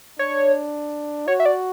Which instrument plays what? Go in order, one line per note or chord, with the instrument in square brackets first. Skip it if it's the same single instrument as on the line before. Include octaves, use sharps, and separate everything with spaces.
[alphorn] D4 [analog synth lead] C#5
[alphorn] F#4 [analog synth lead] C#5
[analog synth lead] E5
D5